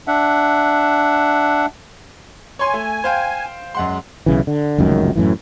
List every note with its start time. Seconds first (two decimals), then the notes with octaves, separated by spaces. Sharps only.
0.07 D4 E5 F#5
2.59 C#5 G#5 C6
2.73 A3
3.04 C5 F5 G5
3.75 F#2 G#3 F#5 C6
4.26 B1 C#3 E3
4.47 D3
4.78 F1 C#2 F#2 D#3
5.16 F#2 A2 E3